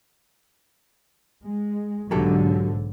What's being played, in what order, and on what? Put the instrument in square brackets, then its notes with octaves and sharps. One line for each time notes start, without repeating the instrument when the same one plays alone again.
[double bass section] G#3
[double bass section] B1 G#2 D3 [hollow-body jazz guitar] F#3 G4 A4